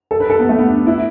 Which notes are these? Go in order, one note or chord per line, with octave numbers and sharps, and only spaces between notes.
A4
B4
A4
B3
A3
B3
D4
E4